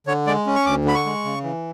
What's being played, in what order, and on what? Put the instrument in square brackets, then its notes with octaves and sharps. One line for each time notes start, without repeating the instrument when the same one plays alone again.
[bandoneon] D3 C#5
G#3 D5
C#4
C#6
D2 D6
D3 B5
C#6
G#3
C#3
E3